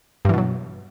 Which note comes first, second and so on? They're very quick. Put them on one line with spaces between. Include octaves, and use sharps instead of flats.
G2 E3 B2 F#3